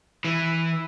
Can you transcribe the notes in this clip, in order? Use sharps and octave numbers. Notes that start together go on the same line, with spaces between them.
E3